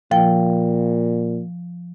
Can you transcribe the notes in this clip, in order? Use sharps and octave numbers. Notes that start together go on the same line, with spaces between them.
A#2 F3 G5